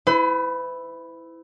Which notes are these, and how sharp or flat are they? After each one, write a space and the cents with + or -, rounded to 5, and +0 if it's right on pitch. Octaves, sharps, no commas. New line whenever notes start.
E4 +0 B4 +45